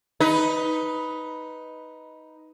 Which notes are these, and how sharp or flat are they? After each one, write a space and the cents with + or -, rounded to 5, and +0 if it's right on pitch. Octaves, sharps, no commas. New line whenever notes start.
D#4 +10 B4 +0